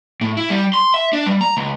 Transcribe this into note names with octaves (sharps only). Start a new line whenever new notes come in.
A2
E4
G3
C6
E5
D4
G3
A#5
C#2